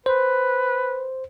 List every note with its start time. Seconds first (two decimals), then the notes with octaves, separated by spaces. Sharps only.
0.06 B4 C5